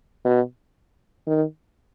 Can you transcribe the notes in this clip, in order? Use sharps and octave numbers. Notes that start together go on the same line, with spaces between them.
B2
D#3